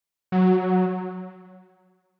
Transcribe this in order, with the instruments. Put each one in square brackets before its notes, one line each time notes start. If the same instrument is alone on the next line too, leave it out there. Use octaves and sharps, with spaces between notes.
[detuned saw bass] F#3